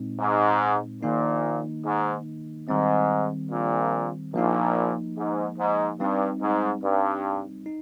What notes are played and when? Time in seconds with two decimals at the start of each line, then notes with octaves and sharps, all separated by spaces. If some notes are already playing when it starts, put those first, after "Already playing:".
Already playing: A#2 G#3 C4 D#4
0.19 G#2
1.02 A#1 A#2 D#3 A#3 D#4
1.85 G#2
2.68 G#2 D#3 G3 C4
3.51 A#1 A#2
4.34 A#1 A#2 F3 A#3 D#4
5.17 G#2
5.58 G#2
6.00 G2 G3 C4 D#4
6.42 G#2
6.83 G2
7.66 D#4